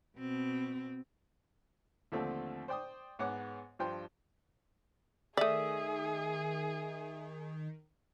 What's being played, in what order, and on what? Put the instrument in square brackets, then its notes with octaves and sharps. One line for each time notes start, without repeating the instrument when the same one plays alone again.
[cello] B2 C4
[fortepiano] D#2 D3 F3 A3 C4
C5 D5 G5 C6 D#6
G#2 B3 C#5 F#5 D6
G2 F3 C5 G5 C6
[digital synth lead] D#3 [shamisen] A3 D5 [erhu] G#4 [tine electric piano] E5 D#6